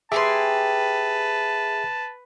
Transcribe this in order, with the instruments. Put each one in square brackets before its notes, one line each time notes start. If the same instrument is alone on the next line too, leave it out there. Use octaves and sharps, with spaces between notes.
[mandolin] G4 G#5 C6 [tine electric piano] G#4 E5 [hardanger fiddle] B4 [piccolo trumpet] A5